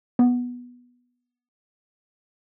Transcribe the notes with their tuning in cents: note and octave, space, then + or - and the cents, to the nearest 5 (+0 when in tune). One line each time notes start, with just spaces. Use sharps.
B3 -10